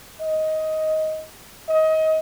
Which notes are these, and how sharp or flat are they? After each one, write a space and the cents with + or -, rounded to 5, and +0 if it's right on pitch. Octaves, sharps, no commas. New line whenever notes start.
D#5 +10
D#5 +25